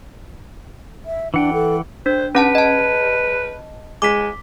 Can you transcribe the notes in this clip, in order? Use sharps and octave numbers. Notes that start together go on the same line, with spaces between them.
E5
E3 D4 F#5 G5
A4
D4 C5
C#4 B4 F#5 A5
D#5 A5
G#3 D6 B6